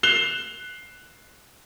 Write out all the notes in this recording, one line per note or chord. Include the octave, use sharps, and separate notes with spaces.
F#6 C7 E7 F7 G7